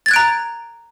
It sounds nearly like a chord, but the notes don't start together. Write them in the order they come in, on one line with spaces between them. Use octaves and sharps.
A6 G#6 F#6 D7 A#5